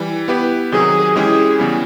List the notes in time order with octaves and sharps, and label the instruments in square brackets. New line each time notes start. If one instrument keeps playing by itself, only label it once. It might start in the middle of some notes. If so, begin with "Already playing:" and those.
Already playing: [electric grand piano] E3 G3
B3 E4 G4 B4
[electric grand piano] C3 D#3 F#3 [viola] G#4
[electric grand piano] E3 G#3 C#4 E4 G4 [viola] G#4
[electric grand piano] C#3 E3 G3 B3